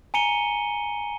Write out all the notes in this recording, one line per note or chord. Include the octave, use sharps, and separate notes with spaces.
G#5 A#5 C#7 D#7 G7